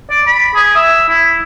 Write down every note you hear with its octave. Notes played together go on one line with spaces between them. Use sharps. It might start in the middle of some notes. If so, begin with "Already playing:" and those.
D5
B5
G#4
E5
E4